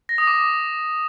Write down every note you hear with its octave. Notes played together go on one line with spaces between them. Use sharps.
A#6
D#6
D6